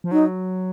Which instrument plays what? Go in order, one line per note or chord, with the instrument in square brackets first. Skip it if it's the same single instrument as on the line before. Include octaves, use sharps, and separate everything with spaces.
[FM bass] F3
[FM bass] F#3 [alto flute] D#4